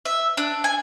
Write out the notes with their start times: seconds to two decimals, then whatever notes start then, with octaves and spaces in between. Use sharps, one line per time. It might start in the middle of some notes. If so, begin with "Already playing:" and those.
0.05 E5
0.37 D4
0.64 G#5